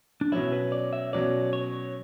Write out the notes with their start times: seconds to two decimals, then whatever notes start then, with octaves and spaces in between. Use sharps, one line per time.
0.21 D4
0.32 B2 F#3 C#4 E4
0.52 B4
0.72 D5
0.93 E5
1.13 B2 F#3 C#4 D5
1.53 C#5